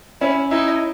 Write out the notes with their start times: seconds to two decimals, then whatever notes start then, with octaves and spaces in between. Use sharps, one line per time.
0.21 C#4 E4
0.51 D#4 E4